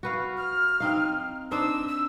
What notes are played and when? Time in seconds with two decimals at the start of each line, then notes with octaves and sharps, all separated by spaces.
0.03 F#4 B4 F5
0.37 F6
0.80 C4 D#4 F5
1.51 D4 D#4 C5 E6
1.88 E6